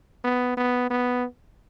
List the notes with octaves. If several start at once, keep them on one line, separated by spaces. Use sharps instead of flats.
B3
B3
B3